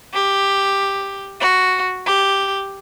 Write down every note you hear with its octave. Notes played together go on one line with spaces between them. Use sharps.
G4
F#4
G4